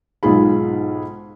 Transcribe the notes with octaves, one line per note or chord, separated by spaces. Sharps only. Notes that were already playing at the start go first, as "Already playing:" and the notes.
B1 G#2 F4 G#4 B5